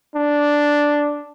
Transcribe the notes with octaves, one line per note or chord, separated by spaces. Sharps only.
D4